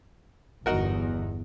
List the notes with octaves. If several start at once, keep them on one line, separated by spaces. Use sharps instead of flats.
G1 E2 D#4 F#4 A#4